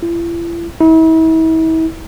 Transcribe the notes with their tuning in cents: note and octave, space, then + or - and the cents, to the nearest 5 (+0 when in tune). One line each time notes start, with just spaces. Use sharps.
E4 +45
E4 -40